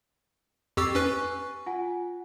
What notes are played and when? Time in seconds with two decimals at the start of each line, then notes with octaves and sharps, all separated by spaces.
0.77 F2 G4 C#6 E6 A6 C7
0.95 C#4 B4 G#5 C#6 F#6
1.66 F4 F#5 G#5